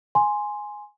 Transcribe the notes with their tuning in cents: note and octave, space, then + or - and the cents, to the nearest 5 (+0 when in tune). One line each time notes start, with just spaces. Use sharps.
G#5 +0 C6 +0